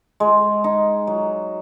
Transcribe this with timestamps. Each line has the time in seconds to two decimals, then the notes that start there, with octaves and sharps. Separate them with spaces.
0.20 G#3
0.64 D#4
1.07 F#3